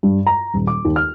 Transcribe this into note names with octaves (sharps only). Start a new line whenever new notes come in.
G2
A#5
D#1
D6
D#2
F6